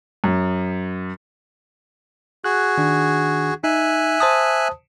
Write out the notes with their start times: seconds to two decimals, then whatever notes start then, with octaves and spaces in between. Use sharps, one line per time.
0.24 F#2
2.44 F#4 G#4 F#6
2.78 D#3 D4
3.64 D#4 E5 G#5 F#6
4.20 C5 A5 D#6